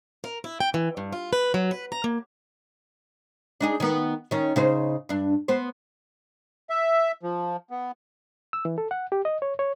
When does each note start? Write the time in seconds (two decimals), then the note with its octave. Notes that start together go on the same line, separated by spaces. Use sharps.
0.24 A#4
0.44 E4
0.60 G5
0.74 E3
0.97 G2
1.12 F4
1.33 B4
1.54 F#3
1.71 B4
1.92 A#5
2.04 A#3
3.61 D4 D#4 G#4
3.80 D#3 B3
4.31 D#3 C#4
4.56 C#3 D#4 C5
5.09 G2 D4
5.48 B3 C5
6.70 E5
7.23 F3
7.70 B3
8.53 E6
8.65 E3
8.78 A4
8.91 F#5
9.12 G4
9.25 D#5
9.42 C#5
9.59 C#5